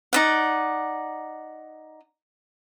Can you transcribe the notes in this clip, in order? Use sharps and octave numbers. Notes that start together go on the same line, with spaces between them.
D#4 D5 F#5